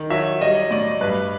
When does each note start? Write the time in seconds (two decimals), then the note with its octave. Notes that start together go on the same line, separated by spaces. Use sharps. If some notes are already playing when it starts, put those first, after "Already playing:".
Already playing: D#3
0.10 F#3 E5
0.41 G3 D#5
0.71 A2 D5
1.01 G2 B4